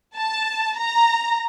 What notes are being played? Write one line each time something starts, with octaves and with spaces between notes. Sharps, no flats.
A5
A#5